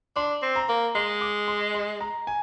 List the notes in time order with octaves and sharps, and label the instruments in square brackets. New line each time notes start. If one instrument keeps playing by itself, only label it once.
[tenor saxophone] D4 [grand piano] C6
[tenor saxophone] C4
[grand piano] A#5
[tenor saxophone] A#3
[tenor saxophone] G#3 [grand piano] C6
[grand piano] D6
C6
C6
A#5
G#5